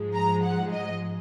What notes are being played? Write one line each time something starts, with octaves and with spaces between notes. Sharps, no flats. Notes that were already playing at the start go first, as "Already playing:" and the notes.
Already playing: G#2 F3 G#3
A#5
F#5
D#5